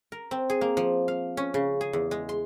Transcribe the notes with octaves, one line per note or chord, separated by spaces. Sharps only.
A#4
C4
G#4
A#3
F3
F5
C#4
C#3
G#4
E2
G#3
C6